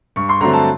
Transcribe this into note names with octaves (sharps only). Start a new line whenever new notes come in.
G2 C#6
C6
D3 F#3 A3 C4 A#5
A5